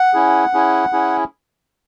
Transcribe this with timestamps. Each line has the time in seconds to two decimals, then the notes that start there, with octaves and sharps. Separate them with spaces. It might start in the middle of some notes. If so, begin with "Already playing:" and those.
Already playing: F#5
0.14 C#4 E4 G#4
0.54 C#4 E4 G#4
0.92 C#4 E4 G#4